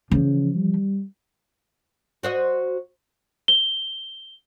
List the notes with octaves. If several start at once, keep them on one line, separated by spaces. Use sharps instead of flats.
C#3 E3 F3
G3
F#4 C5 D#5
G7